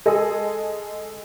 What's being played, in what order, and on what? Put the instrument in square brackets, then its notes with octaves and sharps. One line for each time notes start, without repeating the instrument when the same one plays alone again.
[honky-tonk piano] G#3 G#4 A4 D#5